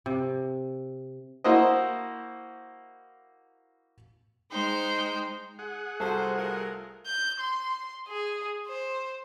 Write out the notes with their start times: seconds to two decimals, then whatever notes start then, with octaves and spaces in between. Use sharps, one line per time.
0.06 C3
1.44 A#3 E4 F#4 C5 D#5
4.51 G#3 D#4 C5 G5
5.59 G#4 F#5
6.00 C2 F#4 A4 C5 A5
6.37 A3 F4 A#4
7.06 G6
7.40 C6
8.08 G#4
8.67 C5